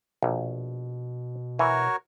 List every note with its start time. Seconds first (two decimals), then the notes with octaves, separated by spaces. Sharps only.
0.23 A#1 B2
1.59 E3 F#4 A#4 C#5